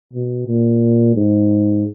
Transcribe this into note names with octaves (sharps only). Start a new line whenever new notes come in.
B2
A#2
G#2